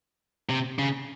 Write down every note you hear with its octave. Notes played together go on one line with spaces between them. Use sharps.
C3
C#3